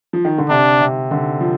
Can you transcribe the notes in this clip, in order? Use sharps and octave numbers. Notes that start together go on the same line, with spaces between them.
F3
D#3
D3
C3 D4
C3
D3
F3